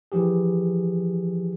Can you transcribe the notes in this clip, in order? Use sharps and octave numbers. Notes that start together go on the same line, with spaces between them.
E3 F3 G4 G#4